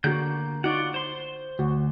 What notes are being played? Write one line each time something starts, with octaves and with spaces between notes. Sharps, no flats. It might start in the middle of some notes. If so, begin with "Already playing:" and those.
D3 A#3 F#4 F#5 G6
D#4 F4 F#4 D5 F#5
C5 C6
D2 F#4